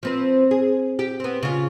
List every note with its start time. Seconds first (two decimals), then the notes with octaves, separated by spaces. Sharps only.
0.03 F3 C4 B4
0.51 G#4
0.99 G4
1.20 B3 C4
1.43 C#3 F4